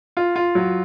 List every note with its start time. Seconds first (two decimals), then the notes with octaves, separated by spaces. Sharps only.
0.17 F4
0.36 F4
0.55 F#3